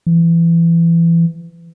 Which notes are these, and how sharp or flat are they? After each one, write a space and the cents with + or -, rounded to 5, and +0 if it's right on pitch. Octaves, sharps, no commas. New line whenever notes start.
E3 +25